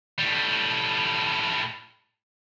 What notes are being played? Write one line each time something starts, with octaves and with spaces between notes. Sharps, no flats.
A2 G3